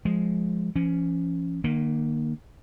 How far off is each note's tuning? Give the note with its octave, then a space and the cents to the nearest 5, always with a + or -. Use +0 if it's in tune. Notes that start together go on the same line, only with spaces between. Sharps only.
F3 +0 G#3 +0
F3 -40 C#4 +0
D#3 -40 A#3 +0